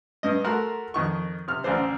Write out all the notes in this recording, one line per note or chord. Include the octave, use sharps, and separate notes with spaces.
G2 D#5
A3 F#4 A#4 F#5 C6
F2 D#3 C#6
C3 F6
A1 D2 C#3 D4 C5